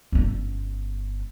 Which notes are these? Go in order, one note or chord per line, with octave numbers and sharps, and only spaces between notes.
G1 C#4